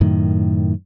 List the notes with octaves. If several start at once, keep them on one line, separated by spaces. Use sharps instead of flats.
F#2 A2 D#3